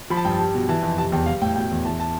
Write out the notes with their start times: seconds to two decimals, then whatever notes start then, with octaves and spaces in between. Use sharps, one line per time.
0.10 F3 B5
0.17 A5
0.25 G2 G5
0.33 A5
0.39 G3
0.55 B2
0.69 E3 A5
0.83 F2
0.97 C3 A5
1.12 E2 G5
1.26 G3 F5
1.41 A2 G5
1.55 B2 G5
1.71 E2
1.85 E3 A5
2.00 A5